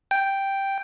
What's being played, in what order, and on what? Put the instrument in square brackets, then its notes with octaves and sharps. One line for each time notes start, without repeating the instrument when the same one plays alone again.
[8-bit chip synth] G5